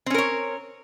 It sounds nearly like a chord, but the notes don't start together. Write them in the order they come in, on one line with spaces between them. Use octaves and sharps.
C4 C#4 A#4 C#5